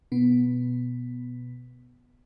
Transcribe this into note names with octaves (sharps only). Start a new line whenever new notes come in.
B2 B3